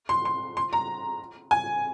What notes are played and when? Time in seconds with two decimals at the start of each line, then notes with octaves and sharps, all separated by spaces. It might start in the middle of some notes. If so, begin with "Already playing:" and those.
0.09 C6
0.25 C6
0.57 C6
0.73 A#5
1.51 G#5